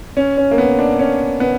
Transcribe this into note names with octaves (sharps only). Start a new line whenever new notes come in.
C#4
C#4
A#3
B3
D4
C#4
B3